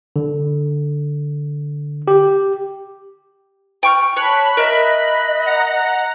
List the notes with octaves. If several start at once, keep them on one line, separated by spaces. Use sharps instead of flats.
D3
G4
G5 C#6 F6
C#5 A5 B5 F#6
A#4 D#5 E5
F#5 A#5